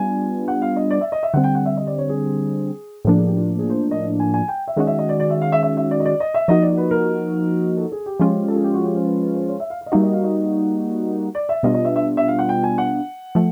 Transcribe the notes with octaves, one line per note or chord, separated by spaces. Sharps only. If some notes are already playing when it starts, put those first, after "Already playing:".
Already playing: G3 B3 D4 F4 G#5
F#5
F5
D#5
D5
E5
D#5
E5
D3 G3 C4 F#5
G5
F#5
E5
D#5
D5
C#5
G#4
A2 F3 A#3 D4 G#4
G#4
G4
F4
G#4
C5
D#5
G#5
G#5
G5
E5
D#3 G#3 C#4 F#4 D#5
E5
D#5
D5
D5
E5
F5
E5
E5
E5
D5
D#5
D5
D#5
E5
F3 A#3 D#4 F#4 D#5
D5
B4
A#4
A4
G#4
G4
F3 G#3 C#4 F4
A4
G#4
G4
F#4
G4
C5
B4
B4
C5
C#5
E5
F5
F5
D#5
G3 A#3 D#4 F#4 E5
D#5
F5
D#5
D5
E5
B2 G3 B3 D4 F4 D#5
D#5
E5
E5
E5
F5
F#5
G5
G#5
F#5
F3 A3